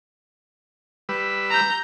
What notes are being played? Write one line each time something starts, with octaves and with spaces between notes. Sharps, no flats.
G3 B4 E6
A#5 G6